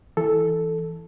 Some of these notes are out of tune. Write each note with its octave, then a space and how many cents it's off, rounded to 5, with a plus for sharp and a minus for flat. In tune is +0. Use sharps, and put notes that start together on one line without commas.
E3 +0 A4 +0